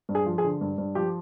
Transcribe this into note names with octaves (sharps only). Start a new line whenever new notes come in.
G2
G#4
F3
G#4
D3
G2
G2
F3 G4